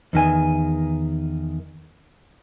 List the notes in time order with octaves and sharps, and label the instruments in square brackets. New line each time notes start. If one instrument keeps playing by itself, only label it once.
[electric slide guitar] E2 D#3 G#5